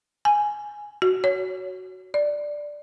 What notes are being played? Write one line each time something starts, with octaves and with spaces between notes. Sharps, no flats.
G#5
F#4
C#5
D5